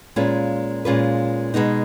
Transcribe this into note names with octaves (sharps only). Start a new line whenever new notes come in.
A#2 G#3 C#4 F4 B4
A#2 G#3 C#4 F4 B4
B2 G#3 B3 D#4